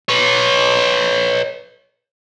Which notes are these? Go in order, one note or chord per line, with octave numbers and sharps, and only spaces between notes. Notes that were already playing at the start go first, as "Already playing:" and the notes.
B4 C#5